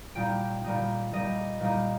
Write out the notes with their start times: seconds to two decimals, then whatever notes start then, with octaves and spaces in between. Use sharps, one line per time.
0.15 A#2 G3 D#4 G5
0.64 A#2 G3 D#4
1.13 A#2 G3 D#4 D#5
1.60 A#2 G3 D#4